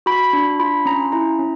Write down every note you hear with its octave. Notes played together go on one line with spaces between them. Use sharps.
F#4 B5
D4
F4 B5
C#4 A#5
E4 A#5
C#4